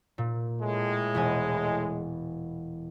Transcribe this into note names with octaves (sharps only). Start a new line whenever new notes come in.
A#2
A2 G#3
E1 B3 G#5